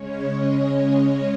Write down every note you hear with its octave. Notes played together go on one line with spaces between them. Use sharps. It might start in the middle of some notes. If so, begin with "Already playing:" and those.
Already playing: C#3 G#3 C#4 C#5
D#5